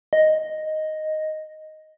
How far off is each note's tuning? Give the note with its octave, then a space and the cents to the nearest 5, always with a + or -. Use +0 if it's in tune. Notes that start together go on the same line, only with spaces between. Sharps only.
D#5 +0